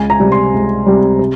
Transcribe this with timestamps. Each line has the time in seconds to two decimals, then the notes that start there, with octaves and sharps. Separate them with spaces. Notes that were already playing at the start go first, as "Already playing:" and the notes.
Already playing: C#2 G#5
0.10 A#5
0.20 C3 G3
0.32 C6
0.54 C#2
0.87 C3 G3
1.19 C3